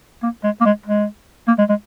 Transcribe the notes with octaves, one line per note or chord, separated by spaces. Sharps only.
A#3
G#3
A#3
G#3
G#3
A#3
G#3
G#3